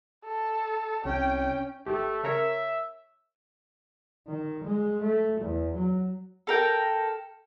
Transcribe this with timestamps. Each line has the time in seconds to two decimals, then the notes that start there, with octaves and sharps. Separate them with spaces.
0.24 A4
1.05 C2 C#4 G5
1.86 G#1 A3 G4
2.23 C#3 A#4 C#5 E5
4.28 D#3
4.64 G#3
5.02 A3
5.41 E2
5.75 F#3
6.47 A4 A#4 G5